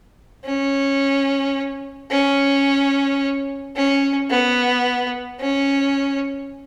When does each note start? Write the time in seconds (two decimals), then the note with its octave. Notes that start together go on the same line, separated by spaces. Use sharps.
0.45 C#4
2.10 C#4
3.76 C#4
4.31 B3
5.41 C#4